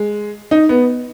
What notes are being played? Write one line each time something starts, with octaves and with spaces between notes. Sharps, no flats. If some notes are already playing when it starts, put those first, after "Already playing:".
Already playing: G#3
D#4
B3